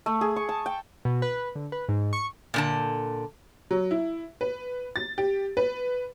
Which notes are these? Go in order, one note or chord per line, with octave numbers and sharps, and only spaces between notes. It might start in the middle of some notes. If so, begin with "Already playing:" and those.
A3
G#4
C#6
A5
G5
B2
B4
D3
B4
G#2
C#6
A#2 D3 A5
F#3
E4
B4
A6
G4
B4